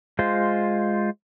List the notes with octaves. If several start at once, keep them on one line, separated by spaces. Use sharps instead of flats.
G#3 F4 C5